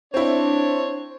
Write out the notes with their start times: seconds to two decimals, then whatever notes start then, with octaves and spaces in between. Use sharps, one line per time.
0.14 C4 D4 E4 C5 C#5